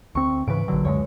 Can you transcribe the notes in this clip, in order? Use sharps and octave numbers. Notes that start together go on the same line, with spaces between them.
D2 C4 C#6
G#2 C#3 E3 B4 D7
A#1 D3 F#3
C#2 F#2 G#3 C#5